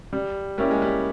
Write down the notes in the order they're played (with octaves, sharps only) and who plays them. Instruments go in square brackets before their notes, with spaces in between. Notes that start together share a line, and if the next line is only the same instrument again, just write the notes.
[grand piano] G3
[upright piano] G3 [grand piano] A#3 C#4 E4 G4
[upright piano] G#3
G3